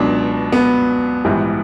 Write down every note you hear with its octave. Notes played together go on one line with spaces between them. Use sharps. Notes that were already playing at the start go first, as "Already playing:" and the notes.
Already playing: C#2 B2 F#3 D4
B3
A#1 G#2 E3 G3